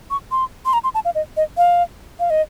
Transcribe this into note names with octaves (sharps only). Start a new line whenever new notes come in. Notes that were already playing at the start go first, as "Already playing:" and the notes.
C#6
C6
C6
A#5
C6
A5
F5
D#5
D#5
F5
F5
D#5